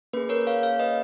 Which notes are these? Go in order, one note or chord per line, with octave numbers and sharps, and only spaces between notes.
A#3 C#4 G#4 B4
A#4 C#5
C#5 F5
C#5 F5
B4 D#5